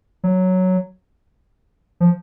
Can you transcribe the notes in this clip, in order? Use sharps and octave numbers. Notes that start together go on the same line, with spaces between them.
F#3
F3